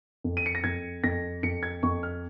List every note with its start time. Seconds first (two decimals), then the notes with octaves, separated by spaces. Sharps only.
0.24 F2
0.37 D#7
0.46 C#7
0.55 A#6
0.64 F2 G#6
1.04 F2 A#6
1.43 F2 C#7
1.63 G#6
1.83 F2 C#6
2.03 F6